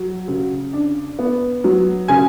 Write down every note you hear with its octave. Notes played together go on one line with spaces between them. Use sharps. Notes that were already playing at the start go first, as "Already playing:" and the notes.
Already playing: F#3
C#3
D4
B3
F#3
C#3 G#5